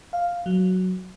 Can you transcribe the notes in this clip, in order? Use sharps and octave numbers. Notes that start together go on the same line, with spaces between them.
F5
F#3